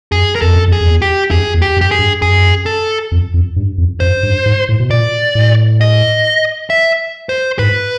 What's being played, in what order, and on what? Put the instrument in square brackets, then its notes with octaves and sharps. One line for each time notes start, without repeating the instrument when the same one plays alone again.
[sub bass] F#2 [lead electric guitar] G#4
[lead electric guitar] A#4
[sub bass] F2 [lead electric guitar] A4
[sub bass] F#2
F2
[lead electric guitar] G#4
[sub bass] F2
E2
[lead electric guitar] G4
[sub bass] F2 [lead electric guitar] G#4
[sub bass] E2
[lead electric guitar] G4
[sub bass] F#2
[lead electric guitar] G4
G#4
[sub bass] G2
[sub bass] F#2 [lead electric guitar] G#4
[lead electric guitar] A4
[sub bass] F2
F2
G2
F2
[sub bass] F#2 [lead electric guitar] C5
[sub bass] G2
G#2
A2
B2
[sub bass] A#2 [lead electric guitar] D5
[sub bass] A2
[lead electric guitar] D#5
E5
C5
[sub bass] G#2 [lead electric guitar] B4